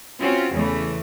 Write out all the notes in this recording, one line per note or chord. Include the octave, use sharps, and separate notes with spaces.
C4 C#4 F4 F#4
E2 C#3 E3 A3